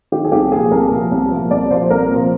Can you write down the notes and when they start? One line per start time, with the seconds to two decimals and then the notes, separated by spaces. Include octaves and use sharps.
0.12 D#3 G4
0.24 G#4
0.32 C2 G4
0.52 A#2 F3 G#4
0.71 C2 A#4
0.91 A#2 F3
1.12 C2
1.31 A#2 F3
1.51 C2 D5
1.71 A#2 F3 C5
1.90 C2 A#4
2.10 A#2 F3 C4